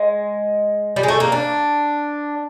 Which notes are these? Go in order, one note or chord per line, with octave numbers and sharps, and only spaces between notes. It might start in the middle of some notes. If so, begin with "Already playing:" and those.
Already playing: G#3
G3
G#3
A3
A#3
D4